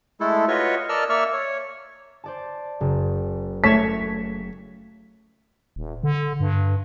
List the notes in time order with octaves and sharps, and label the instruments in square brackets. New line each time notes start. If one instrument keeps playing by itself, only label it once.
[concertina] G#3 A3 E4 A4
F4 F#4 B4 C#5 D#5 C#6
A#4 D5 D#5 A5 E6 F6
A#3 D5 E5 C#6 E6 F6
C#5
[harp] C5 D5 A5
F#1
[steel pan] A3 C#5 A5 [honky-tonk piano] B6
[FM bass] D#1
D3
G2